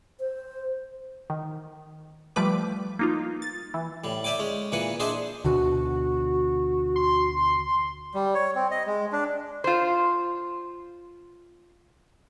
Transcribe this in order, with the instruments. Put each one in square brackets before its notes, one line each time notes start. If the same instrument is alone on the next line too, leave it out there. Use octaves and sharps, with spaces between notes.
[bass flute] C5
[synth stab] D#3
F3 G3 A3 B4 D6
A#3 D#4 F4
A6
E3
[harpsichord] A2 G3
D5 E5 G5 G#5 D6
G#3 C#4
A#2 E3 B4 F#5 G#5
D4 G#4 C5 D#5 E5 G#5
[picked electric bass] D2 B2 D3 [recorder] F#4
[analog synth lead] C6
[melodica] G3
C#5
C4
D#5
G#3
D4
[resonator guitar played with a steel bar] F4 C5